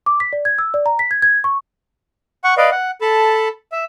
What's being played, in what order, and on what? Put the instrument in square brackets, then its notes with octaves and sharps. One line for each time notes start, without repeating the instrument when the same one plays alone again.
[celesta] D6
B6
D5
G#6
E6
D5
A#5
B6
G#6
G#6
C#6
[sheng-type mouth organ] F#5 C#6
B4 D5 D#5 F5
F#5
A4 A5 B5
E5